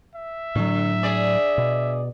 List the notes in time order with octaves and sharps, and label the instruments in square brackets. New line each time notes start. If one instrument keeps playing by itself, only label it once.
[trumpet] E5
[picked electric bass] A2 F#3 [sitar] D3
[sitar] G#4 D5
[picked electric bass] B2